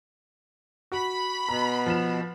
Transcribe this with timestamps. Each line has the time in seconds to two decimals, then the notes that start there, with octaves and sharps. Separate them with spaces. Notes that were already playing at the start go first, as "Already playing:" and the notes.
0.92 F#4 B5
1.49 B2 A#5
1.86 F3 E7